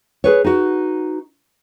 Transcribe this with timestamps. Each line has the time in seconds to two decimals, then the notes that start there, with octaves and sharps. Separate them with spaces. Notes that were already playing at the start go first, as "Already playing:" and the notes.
0.24 G#4 B4 C#5
0.44 D#4 F#4